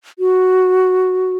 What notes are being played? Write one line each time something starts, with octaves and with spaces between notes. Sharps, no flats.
F#4